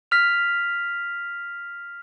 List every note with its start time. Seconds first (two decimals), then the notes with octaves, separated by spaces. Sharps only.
0.11 F6 B6 F7